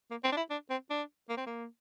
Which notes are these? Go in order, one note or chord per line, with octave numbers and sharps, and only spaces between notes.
A#3
C4
D4
E4
D4
C4
D4
A#3
C4
A#3